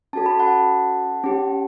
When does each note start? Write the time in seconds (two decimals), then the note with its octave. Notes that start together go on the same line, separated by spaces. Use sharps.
0.13 C#4 F#4 A4 A5
0.26 B5
0.39 F#5 A5
1.24 C#4 G4